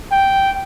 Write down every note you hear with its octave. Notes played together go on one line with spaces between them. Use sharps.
G5